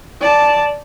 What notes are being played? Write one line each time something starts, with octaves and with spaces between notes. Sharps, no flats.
D5 A5